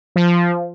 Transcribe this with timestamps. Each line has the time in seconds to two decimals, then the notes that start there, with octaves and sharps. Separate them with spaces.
0.16 F3